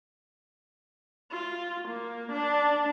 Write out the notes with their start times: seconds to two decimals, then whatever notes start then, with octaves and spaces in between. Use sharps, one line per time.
1.31 F4
1.88 A#3
2.32 D4